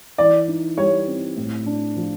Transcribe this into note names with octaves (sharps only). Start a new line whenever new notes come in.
E3 D5
D#4
G3 C#5
C4
A2
D4
F3